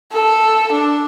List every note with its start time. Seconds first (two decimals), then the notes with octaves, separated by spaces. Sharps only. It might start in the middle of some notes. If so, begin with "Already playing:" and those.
0.12 A4
0.72 D4